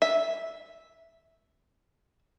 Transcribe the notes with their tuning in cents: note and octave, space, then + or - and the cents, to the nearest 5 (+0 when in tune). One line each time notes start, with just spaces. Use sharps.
E5 -5